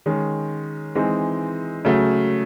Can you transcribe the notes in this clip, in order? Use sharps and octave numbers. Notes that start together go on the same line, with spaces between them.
D#3 G#3 C#4
E3 G#3 C4 D#4
C#3 F#3 A3